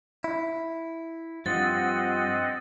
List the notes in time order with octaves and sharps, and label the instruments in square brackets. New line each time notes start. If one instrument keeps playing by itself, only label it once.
[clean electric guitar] E4
[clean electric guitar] G2 F3 [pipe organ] C4 D#5 F#5 [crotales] A6